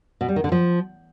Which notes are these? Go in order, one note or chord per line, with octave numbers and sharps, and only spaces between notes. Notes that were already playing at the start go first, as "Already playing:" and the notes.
B2
G3
D#3
D3
F3